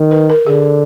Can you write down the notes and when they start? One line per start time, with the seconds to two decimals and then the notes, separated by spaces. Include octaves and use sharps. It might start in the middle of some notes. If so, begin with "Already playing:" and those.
Already playing: D#3
0.11 B4
0.30 A#4
0.46 D3 G#4